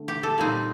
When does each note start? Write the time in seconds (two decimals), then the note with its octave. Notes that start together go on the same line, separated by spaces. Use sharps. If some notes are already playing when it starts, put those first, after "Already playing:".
Already playing: D3 A3
0.08 G4
0.23 A4
0.38 A#2 G3 C4 D#4